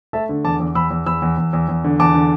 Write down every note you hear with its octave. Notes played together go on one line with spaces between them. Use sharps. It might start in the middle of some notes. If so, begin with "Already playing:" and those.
A3 E5 A5
D3
E2 A5 D6
E2
E2 B5 E6
E2
E2 B5 E6
E2
E2
E2
E2
D3
E2 A5 D6
D3